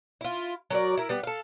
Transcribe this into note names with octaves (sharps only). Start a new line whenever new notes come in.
E4 F4
F#3 A#4 D5
E4 A#4
G3 B3
A4 F5